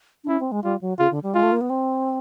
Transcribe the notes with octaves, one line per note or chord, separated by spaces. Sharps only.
D4
C#4 E4
C4
G#3
G3 F4
F#3
C#3 F4
D3
G3
G#3 F4
A3
A#3
B3
C4